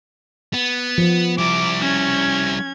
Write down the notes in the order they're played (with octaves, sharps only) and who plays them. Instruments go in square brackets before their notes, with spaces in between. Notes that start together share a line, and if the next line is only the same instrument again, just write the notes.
[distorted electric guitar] B3
[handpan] F3
[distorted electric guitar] G3 E4 [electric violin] D6
[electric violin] C#4 G#6